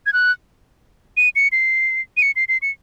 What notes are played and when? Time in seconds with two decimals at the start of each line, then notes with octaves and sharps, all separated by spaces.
0.06 G#6
0.13 F#6
1.17 D#7
1.36 C#7
1.52 C7
2.17 D#7
2.22 C#7
2.36 C7
2.48 C7
2.62 C#7